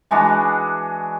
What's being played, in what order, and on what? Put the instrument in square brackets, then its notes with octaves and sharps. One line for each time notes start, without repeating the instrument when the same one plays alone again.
[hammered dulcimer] E3 G#3 D4 F#4